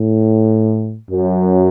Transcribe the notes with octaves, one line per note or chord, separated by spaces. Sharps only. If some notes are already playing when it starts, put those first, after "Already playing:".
Already playing: A2
F#2